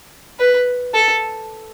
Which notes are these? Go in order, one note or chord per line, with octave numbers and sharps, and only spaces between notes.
B4
A4